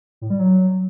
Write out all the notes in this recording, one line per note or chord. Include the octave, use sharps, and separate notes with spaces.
A2
G3
F#3